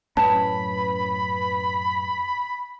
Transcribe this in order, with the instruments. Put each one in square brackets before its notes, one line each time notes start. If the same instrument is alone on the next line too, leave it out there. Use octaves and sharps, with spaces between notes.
[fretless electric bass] F#2 A2 C#4 [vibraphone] B4 [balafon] A5 [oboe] B5